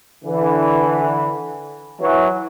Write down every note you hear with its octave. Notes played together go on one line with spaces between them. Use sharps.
D3 E3
E3 F#3